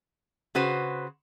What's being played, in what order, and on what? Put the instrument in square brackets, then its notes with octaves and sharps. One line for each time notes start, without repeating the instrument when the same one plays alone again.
[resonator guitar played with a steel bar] C#3 F#4 B4 C5